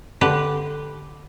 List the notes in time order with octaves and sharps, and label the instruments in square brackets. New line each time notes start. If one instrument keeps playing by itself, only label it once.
[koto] D3 G4 B4